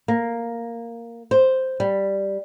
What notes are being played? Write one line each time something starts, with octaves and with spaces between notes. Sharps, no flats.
A#3
C5
G3